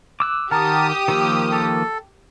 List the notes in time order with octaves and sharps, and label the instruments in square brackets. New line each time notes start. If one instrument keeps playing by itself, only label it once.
[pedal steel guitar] D6 E6 F#6
[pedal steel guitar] D#3 F#5 F6 [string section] G4 D#6 [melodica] A#4 A5
[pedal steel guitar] D#3 F3 A#3 [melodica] E6
[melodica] A4